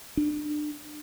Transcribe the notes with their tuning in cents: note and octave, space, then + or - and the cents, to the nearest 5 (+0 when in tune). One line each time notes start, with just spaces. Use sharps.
D4 +30